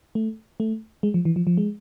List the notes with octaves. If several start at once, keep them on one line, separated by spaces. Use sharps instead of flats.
A3
A3
G#3
F3
E3
F3
F3
G#3